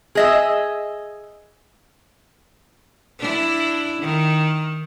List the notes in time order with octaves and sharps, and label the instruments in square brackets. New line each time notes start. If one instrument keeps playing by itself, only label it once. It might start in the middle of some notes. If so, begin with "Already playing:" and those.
[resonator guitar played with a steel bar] G#4 D#5 E5
[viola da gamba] D4 E4
D#3